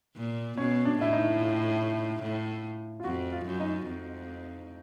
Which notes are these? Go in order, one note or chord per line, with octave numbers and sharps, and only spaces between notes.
A#2
B2 C#4
D4
A2 E4
D#4
F4
A2
F4
F2 F#4
F4
F#2
D#4
F2